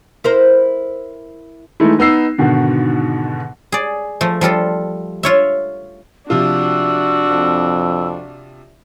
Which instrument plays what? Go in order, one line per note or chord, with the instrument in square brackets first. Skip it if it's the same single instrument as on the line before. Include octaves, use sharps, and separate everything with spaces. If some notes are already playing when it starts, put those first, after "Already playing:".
[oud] E4 A#4 C5
[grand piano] E3 G#3 A3 D#4 E4
B3 D#4 E6 C7
G#2 B2 D3 D#3 F#4
[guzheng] G#4 D5
F3 A3
F3 G3 F4 A4
F4 C#5 E5
[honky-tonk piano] C3 F3 F4 [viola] D4 F#4 [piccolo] E6
[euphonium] F2